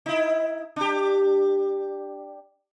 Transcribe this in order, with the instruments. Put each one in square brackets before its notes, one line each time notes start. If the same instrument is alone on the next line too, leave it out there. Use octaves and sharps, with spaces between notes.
[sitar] D#4 E4
D4 G4